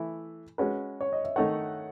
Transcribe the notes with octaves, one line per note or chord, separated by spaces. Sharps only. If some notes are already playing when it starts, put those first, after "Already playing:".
Already playing: E3 A3 E4
G#3 C#4 F#4 B4
C#5
D#5
E5
D#3 A3 D#4 A4 C#5 F#5